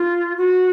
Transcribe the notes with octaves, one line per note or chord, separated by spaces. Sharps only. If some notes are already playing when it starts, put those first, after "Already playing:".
Already playing: F4
F#4